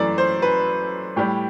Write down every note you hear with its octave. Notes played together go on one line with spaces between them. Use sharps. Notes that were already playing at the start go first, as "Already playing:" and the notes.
Already playing: F#2 E3 A3 D5
C5
B4
A2 G3 G4